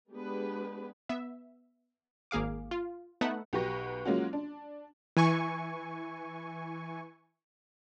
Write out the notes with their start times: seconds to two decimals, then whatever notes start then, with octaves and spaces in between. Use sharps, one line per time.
0.12 G#3 B3 D4 G4 G#4 B4
1.09 B3 E5
2.31 G#1 A#3 G#4 F5 D6
2.71 F4
3.21 A3 B3 D#4 E5 F#5
3.53 B1 F#4 G4 B4 C#6 A#6
4.05 F#3 G#3 A#3 C#4 F4 F#4
4.33 D4
5.17 E3 G#5 C#6